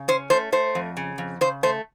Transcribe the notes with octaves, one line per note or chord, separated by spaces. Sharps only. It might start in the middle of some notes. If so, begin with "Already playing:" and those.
Already playing: C#3
C#4 C5
A3 C5
A3 C5
F2
C#3
F2
C#3 C5
A3 C5